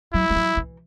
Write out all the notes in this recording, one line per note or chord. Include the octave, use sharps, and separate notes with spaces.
F#3 E4
G#3
F#3
E3